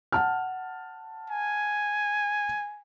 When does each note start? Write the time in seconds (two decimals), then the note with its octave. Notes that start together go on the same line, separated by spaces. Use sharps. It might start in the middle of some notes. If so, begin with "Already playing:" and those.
0.12 F#5 A5 F6
1.30 G#5